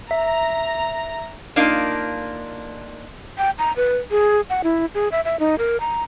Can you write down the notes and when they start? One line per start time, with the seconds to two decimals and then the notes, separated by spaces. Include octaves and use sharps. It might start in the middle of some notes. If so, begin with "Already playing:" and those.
0.11 E5 A#5
1.56 A#3 D4 D#4 F4
3.38 G5
3.59 A#5
3.76 B4
4.11 G#4
4.50 F#5
4.64 E4
4.94 G#4
5.12 E5
5.25 E5
5.40 D#4
5.58 A#4
5.80 A#5